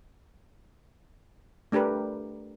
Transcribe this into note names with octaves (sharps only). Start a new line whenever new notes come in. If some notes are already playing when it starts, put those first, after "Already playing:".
A3 D4 G4 A#4 B4